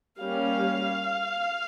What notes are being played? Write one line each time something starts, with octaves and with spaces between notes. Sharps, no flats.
G3 A#3 C#4 F5